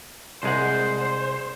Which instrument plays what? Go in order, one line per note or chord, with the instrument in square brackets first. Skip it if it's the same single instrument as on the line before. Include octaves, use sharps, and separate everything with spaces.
[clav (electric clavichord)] C2 G#3 F#5 [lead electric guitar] C5